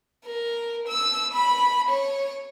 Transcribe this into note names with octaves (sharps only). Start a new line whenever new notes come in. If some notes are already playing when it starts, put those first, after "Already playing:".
A#4
E6
B5
C#5